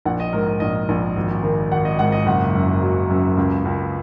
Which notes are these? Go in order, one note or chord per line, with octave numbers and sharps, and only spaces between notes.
A#1 F#5
D#5
G#2 A#4
D#5
A#1 D#5
A#1
G#1
D#3
G#1 F#5
D#5
G#2 F#5
D#5
F#1 F#5
F#2
F#3
F#2
C#2
C#2